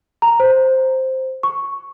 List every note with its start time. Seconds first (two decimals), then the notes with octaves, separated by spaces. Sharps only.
0.22 A#5
0.40 C5
1.43 C#6